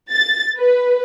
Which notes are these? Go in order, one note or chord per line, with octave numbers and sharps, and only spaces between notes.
A6
B4